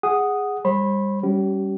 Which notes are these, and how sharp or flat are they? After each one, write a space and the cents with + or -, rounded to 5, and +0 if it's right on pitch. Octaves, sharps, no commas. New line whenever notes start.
G#4 -10 F#5 +0 D#6 +0
G3 +25 C5 +45 B5 -5
G3 +0 C#4 +15 G4 -40